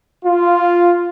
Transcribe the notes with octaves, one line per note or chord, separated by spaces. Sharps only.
F4